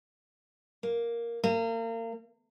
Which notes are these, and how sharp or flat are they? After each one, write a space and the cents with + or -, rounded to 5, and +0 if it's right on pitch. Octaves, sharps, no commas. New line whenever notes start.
A#3 +5
A#3 -35